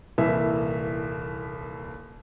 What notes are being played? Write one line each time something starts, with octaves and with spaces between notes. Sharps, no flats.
D#1 C2 E3 A#3 E5